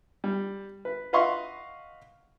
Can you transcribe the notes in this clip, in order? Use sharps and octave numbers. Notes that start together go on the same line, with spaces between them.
G3
B4
B4 D#5 F5 F#5 C6 C#6